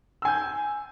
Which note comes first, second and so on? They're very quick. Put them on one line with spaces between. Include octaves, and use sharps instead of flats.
E6 G#5 G6